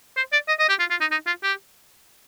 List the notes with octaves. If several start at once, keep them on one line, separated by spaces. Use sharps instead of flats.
C5
D5
D#5
D#5
G4
F4
F4
D#4
D#4
F4
G4